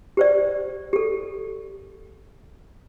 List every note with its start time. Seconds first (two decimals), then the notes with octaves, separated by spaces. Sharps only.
0.17 G4 C5 D5
0.93 G4 A4